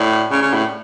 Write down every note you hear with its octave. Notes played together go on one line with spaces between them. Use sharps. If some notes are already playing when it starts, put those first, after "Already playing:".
Already playing: A2 D5
C#3
C#3
A2